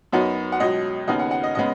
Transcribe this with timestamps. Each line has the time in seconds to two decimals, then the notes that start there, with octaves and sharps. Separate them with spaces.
0.13 F#2 F#3 B3 D#4
0.52 F#5
0.60 C#2 B2 F#3 D#5
1.07 D#2 C#3 B3 D#4 D#5
1.19 F#5
1.31 F#5
1.43 D#5
1.55 C#3 G#3 B3 D#5